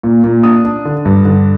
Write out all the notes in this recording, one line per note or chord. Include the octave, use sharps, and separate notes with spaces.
A#2
A#2
D4 D#6
D4
D3
G2
D3